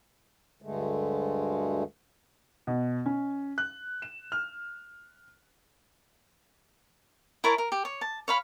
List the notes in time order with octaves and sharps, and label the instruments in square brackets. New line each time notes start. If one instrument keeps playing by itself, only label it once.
[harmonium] D2 G2 D3 G#3 A3
[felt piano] B2
C#4
F#6
E7
F6
[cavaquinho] E4 A#4 C#5 A5
A#4
G4
C#5
A5
C#5 F5 B5